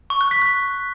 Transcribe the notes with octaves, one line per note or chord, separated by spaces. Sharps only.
C#6
F#6
B6
F#6